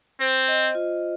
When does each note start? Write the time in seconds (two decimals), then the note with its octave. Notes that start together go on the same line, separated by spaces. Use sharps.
0.20 C4 C5
0.48 D#5
0.75 F4